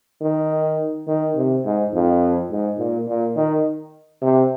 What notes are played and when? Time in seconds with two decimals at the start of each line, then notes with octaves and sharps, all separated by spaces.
0.21 D#3
1.07 D#3
1.36 C3
1.65 G#2
1.93 F2
2.51 G#2
2.78 A#2
3.07 A#2
3.36 D#3
4.22 C3